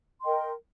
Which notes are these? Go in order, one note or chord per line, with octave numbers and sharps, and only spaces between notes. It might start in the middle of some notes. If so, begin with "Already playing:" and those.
A#4 D#5 G5 C6